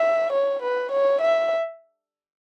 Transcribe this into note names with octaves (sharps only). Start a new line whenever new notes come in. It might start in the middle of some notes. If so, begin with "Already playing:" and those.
Already playing: E5
C#5
B4
C#5
E5